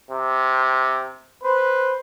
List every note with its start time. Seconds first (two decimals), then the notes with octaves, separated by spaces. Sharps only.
0.11 C3
1.44 B4 C5